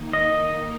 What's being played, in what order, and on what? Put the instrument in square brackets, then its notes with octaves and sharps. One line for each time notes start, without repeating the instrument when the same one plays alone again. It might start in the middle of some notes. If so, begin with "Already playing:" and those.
Already playing: [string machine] D#3 A#3 D#4
[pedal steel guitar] D#5